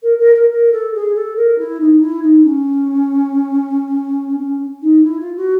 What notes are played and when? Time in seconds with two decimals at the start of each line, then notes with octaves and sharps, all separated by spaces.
0.03 A#4
0.18 A#4
0.35 A#4
0.50 A#4
0.72 A4
0.94 G#4
1.15 A4
1.36 A#4
1.59 E4
1.80 D#4
2.01 E4
2.23 D#4
2.45 C#4
4.40 C#4
4.82 D#4
5.03 E4
5.20 F4
5.37 F#4